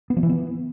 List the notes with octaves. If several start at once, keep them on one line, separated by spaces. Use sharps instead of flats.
B3
F3
E3
B3